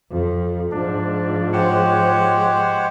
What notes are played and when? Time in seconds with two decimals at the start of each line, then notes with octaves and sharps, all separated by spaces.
0.10 F2
0.71 G#2 F3 D4
1.53 G#3 G4 C5 C#5 F#5